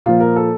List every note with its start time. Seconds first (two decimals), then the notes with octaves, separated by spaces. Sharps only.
0.06 A#2 F3 F4
0.20 A#4
0.36 A4